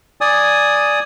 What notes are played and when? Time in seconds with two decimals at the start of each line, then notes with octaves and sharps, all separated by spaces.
0.21 D5 G#5 D#6